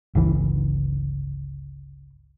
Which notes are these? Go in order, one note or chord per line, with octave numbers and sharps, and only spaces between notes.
G1 C#2 E3